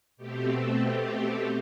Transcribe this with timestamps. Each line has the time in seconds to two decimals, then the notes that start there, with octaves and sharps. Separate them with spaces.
0.17 B2 A3 C4 G4
0.49 A4
0.82 G4